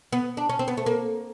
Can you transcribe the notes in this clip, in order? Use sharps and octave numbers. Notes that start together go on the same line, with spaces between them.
B3
D4
C#4
C4
B3
A3
A#3